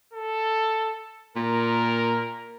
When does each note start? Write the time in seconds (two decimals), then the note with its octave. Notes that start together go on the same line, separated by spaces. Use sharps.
0.13 A4
1.36 A#2 A#4